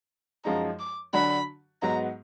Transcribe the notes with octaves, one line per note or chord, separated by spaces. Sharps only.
F#2 F3 G#3 D#4 A#5
D6
D3 F#3 D4 F#4 B5
G#2 F#3 B3 D#4 A#5